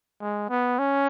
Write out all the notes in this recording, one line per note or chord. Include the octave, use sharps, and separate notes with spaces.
G#3
B3
C#4